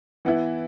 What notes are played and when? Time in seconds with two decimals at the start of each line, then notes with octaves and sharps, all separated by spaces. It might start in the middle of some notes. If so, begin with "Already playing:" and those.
0.25 E3 B3 E4